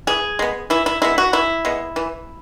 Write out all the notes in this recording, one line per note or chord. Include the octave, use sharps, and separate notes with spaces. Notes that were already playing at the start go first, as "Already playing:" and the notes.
E3 G#4
G#3 B3
E3 E4
E4
G#3 B3 E4
F#4
E3 E4
G#3 B3
E3